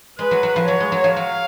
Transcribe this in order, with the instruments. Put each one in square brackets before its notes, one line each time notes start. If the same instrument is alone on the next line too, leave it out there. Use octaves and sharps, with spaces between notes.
[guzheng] G#3 [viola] B4
[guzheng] F#3
F#3
F3
[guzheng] F#3 [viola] C#5
[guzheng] G#3
F#3
F3
[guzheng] F#3 [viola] F5